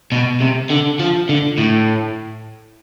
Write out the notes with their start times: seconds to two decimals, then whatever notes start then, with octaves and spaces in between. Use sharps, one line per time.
0.12 B2
0.41 C3
0.70 D3
1.00 F3
1.29 D3
1.58 A2